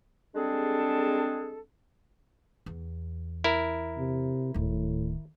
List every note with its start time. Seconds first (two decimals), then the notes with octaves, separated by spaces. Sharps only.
0.35 G3 G#3 C4 D4 G#4 A4
2.66 E2
3.44 E4 A#4
3.98 C3
4.54 D1 A2 D#3